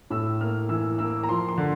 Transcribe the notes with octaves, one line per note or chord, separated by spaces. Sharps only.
A2 E6
A#3 F6
E3 E6
A#3 E6
A#5
F3 C6
C6
D3